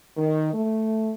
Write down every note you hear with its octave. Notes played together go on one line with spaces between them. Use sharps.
D#3
A3